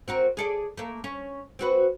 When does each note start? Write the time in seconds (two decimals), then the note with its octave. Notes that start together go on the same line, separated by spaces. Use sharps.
0.08 C4 F#4 A#4
0.37 G#4 A4 D5
0.77 A3 A#3
1.04 C#4
1.59 C4 F#4 B4